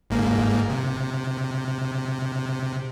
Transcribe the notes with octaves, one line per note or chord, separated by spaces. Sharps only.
G1 G#2 A#3
C3